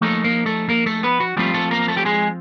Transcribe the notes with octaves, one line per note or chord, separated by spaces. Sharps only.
F3 A3 A#3 D#4 A4
A#3 A#4
A3 A4
A#3 A#4
A3 A4
B3 B4
F#4
F3 G3 A3 C4 F4 G4
A3 A4
A#3 A#4
A3 A4
G4
G#3 G#4